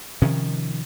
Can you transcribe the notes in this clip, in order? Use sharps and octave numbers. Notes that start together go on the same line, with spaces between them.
C3 D#3 F3 C#4